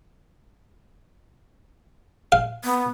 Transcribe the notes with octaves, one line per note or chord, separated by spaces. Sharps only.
F5
B3